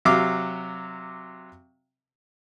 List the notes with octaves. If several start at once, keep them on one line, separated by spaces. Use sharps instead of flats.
C3 F#3 F5 D6